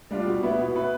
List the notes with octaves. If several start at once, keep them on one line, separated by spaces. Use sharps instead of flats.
G3 D4 F4
B2
B3 E4 B4 E5
B2
B3 E4 B4 E5